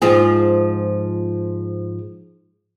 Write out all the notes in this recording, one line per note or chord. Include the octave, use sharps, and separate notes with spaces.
G#2 F3 G#4